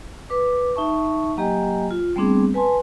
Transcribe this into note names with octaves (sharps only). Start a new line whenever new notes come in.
B4 D6
D#4 E5 A5 C#6
F#3 A#3 G4 D#5 G5 G#5
F4
G3 A3 B3 C4 D4 G#4
B4 G#5 A5 C6